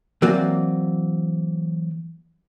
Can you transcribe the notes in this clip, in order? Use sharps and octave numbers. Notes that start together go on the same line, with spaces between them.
E3 F#3 A#3 C4 F#4 D5